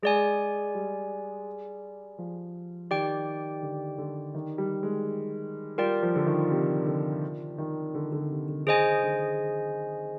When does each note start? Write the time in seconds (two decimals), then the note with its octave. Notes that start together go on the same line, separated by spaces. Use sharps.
0.02 G#3 G#4 D5 G#5
0.75 G3
2.18 F3
2.91 D#3 G4 D5 G5
3.62 D3
3.98 D3
4.35 D#3
4.58 G3
4.83 G#3
5.78 G3 F4 A#4 D5 G5
6.03 F3
6.16 D3
6.27 D#3
6.51 C3
6.87 D3
7.58 D#3
7.95 D3
8.12 D3
8.30 C3
8.48 D3
8.66 D#3 G#4 C5 D#5 G#5
9.03 D3